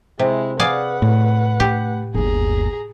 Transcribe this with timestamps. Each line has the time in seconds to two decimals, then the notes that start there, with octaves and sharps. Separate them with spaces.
0.19 C3 G#3 E4
0.59 G#4 B4 D5 F5 F#5
1.02 A2
1.60 A3 G4
2.14 G1 D#2 G#4 A#5